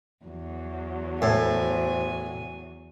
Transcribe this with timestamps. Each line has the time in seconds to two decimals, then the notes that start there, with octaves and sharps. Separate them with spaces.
0.24 E2 F#3
1.22 A2 C5 G#5